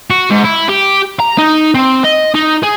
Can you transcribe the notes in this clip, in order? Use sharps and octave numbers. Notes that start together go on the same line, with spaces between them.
F#4
G#2
E4
G4
A#5
D#4
C4
D#5
D#4
G#4